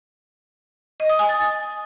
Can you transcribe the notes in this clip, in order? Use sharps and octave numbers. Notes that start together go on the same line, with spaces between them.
D#5
D#6
G#5
A6